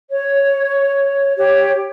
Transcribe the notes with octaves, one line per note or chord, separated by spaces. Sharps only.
C#5
G4 C#5